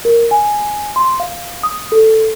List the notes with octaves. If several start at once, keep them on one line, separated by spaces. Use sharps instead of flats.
A#4
G#5
C6
F5
D#6
A4